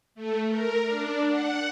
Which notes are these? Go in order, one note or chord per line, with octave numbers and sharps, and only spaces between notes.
A3
A#4
D4
F#5